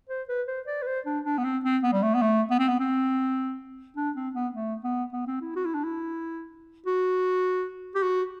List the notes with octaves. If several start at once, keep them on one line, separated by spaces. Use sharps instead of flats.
C5
B4
C5
D5
B4
C5
D4
D4
B3
C4
C4
B3
G3
A3
B3
A3
B3
C4
B3
C4
D4
C4
B3
A3
B3
B3
C4
E4
F#4
E4
D4
E4
F#4
G4
F#4